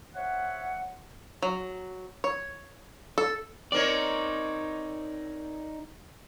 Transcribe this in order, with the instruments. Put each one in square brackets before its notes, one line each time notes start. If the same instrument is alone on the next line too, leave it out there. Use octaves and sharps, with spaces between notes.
[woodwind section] C5 C#5 E5 F#5
[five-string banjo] F#3
C#5
A4
[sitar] C4 A#4 C#5 [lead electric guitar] D#4 D5